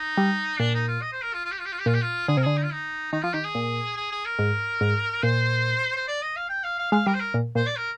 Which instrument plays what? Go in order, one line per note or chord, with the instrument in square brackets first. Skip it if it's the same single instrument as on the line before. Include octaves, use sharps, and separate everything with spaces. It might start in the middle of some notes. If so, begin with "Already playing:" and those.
Already playing: [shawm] D#4
[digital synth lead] G3
[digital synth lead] A#2 [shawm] D4
[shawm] D#4
F4
D#5
C5
A#4
F4
F4
G4
F4
G4
F4
G4
[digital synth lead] A#2 [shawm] F4
[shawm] G4
F4
[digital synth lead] D3 [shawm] G#4
[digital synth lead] C3 [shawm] A#4
[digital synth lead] D3 [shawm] G#4
[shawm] D#4
F4
D#4
[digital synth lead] D#3 [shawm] D#4
[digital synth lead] F3 [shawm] F4
[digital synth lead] D#3 [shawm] G4
[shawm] G#4
[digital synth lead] A#2
[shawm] G#4
G#4
A#4
[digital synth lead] G#2
G#2
[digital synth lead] A#2 [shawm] C5
[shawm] C5
D5
D#5
F5
G5
F5
F5
[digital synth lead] G#3 [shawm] F5
[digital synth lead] G3 [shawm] A#4
[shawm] C5
A#4
[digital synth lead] A#2
[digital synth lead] A#2 [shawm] C5
[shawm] D5
A#4